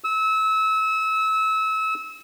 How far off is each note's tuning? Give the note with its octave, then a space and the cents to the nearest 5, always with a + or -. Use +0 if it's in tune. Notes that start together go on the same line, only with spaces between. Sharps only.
E6 -30